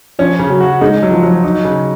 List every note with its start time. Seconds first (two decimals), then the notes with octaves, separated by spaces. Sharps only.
0.19 F3 C#4
0.39 C#3
0.50 F#3
0.61 F#4
0.81 G#3 D#4
1.03 F#3
1.12 F3
1.23 F#3
1.44 D#4
1.64 C#3